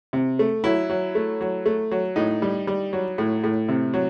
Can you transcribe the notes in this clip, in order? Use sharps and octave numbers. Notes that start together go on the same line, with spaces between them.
C3
A3
F#3 E4
F#3
A3
F#3
A3
F#3
A2 D#4
G3
G3
F#3
A2
A2
C3
F#3